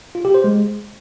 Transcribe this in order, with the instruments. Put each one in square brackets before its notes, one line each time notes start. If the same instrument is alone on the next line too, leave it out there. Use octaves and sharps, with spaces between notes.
[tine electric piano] F4
G4
C5
G#3